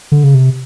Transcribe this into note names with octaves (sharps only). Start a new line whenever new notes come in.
D3
C#3
C3